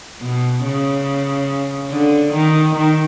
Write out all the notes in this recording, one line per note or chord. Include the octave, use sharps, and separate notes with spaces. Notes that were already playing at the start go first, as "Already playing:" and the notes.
B2
C#3
D3
D#3
D#3